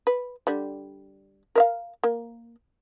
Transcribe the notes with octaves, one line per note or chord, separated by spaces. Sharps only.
B4
D3 G3
A#4 E5 F5
A#3